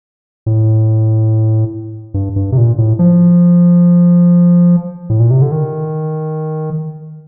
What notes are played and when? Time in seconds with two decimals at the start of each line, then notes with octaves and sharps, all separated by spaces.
0.46 A2
2.14 G2
2.36 G2
2.52 C3
2.57 A#2
2.78 A2
2.99 F3
5.10 A2
5.20 A#2
5.31 C3
5.42 D3
5.52 D#3